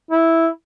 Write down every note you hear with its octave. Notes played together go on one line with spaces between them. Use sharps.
E4